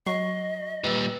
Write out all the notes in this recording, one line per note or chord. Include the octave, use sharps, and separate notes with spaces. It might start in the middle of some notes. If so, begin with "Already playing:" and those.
F#3 D#5 C#6 C7
A#2 G3 B4 E6